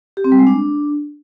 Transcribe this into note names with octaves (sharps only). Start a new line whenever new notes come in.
G4
C4
G3
G#3
D4